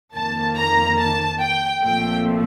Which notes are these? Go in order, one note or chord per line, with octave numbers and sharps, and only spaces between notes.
F2 D#3 A#3 A5
A#5
A5
G5
A#1 A#2 F3 A3 C4 G5